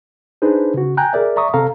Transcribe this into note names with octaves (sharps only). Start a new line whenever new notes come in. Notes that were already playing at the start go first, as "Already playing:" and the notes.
D4 D#4 G#4 B4 C5
C#3 F#4
G5 G#5 A#5 F#6 G6
G#4 A#4 D5 E5
D5 E5 A#5 C#6 D#6
C3 C4 A4 F5 A#5